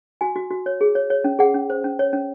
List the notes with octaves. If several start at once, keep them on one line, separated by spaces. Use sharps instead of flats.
F#4 G#5
F#4
F#4
C#5
G#4
C#5
C#5
C#4
G#4 F#5
C#4
C5
C#4
C#5
C#4